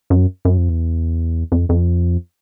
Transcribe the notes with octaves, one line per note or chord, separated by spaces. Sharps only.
F#2
F#2
F2
E2
F2
F2